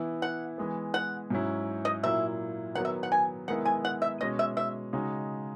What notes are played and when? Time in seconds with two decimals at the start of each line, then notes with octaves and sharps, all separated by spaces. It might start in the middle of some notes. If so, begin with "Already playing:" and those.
Already playing: E3 B3 E4
0.22 F#5
0.58 E3 G#3 B3
0.94 F#5
1.30 G#2 F#3 C#4 E4
1.85 D#5
2.03 A#2 F#3 A#3 E4 E5
2.75 D#3 F#3 B3 F#5
2.85 E5
3.03 F#5
3.12 G#5
3.48 D#3 G#3 B3 E4 F#5
3.65 G#5
3.85 F#5
4.02 E5
4.20 B2 G#3 C#4 D#5
4.39 E5
4.57 E5
4.93 C#3 G#3 D#4 F#4